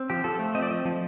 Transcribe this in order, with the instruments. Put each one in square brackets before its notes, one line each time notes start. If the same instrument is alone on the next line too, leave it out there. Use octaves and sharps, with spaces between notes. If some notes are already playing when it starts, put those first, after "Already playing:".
Already playing: [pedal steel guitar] C4
F3 G4
F3 A4
A3
C4 D#5
D5
F3 D#5
F3